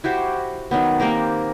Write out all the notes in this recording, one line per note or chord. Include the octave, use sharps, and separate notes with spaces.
E4 F#4 G4 C5
D#3 F#3 B3
A#3 C4 G4 A#4